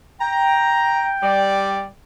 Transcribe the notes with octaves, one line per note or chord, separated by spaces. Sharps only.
G5 A#5
G3 D5